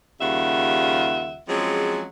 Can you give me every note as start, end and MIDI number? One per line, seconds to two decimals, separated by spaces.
0.20 1.39 39
0.20 1.39 49
0.20 1.39 55
0.20 1.39 65
0.20 1.39 76
0.20 1.39 78
1.49 2.06 53
1.49 2.06 54
1.49 2.06 56
1.49 2.06 60
1.49 2.06 61
1.49 2.06 68